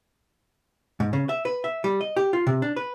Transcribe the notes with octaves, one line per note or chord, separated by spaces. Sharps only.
G#2
C#3
E5
B4
E5
G3
D#5
G4
F4
C3
D4
B4